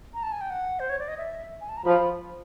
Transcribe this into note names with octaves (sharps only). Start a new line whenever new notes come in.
A#5
A5
G#5
G5
F#5
C5
C#5
D5
D#5
E5
G#5
A5
A#5
F3 B5